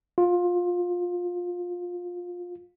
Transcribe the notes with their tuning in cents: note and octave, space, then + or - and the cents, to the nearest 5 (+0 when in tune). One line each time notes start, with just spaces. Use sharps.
F4 +20